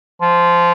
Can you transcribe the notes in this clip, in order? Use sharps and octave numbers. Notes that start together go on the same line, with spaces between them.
F3